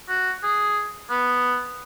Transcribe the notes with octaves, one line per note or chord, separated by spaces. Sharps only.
F#4
G#4
B3